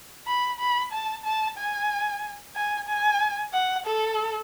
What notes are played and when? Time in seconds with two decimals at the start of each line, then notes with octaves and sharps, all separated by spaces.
0.27 B5
0.60 B5
0.92 A5
1.25 A5
1.58 G#5
2.55 G#5
2.89 G#5
3.54 F#5
3.86 A4